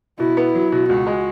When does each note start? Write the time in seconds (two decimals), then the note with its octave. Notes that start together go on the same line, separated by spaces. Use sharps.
0.19 B2 E4
0.37 B3
0.55 F#3
0.72 B2
0.89 C#2 F#4
1.07 G#3